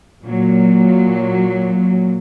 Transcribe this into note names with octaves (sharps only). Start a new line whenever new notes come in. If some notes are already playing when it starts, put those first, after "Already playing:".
A#2 F#3